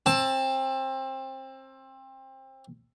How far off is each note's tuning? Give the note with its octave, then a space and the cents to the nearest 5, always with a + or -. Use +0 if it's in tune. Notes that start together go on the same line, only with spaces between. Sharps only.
C4 +25 A5 +0